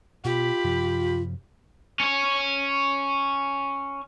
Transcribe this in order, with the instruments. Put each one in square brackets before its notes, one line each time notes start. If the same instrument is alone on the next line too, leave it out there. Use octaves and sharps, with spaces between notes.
[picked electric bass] B2 [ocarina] F4 [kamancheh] G4 B5
[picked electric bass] F#2 C3 F3
[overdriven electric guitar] C#4 C#5